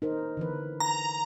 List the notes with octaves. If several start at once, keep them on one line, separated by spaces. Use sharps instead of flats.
D#4 A#4 C5
D3 E3 B4
A#5